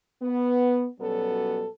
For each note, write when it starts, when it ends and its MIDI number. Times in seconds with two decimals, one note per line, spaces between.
0.22 0.87 59
1.00 1.65 47
1.00 1.65 54
1.00 1.65 55
1.00 1.65 59
1.00 1.65 61
1.00 1.65 69